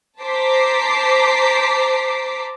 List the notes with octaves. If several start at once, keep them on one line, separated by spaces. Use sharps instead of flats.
C5 A5 A#5 D6 B6 C7